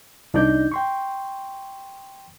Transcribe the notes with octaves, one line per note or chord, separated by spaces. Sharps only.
C2 D4 D#4 D5 G6
G5 C6 C#6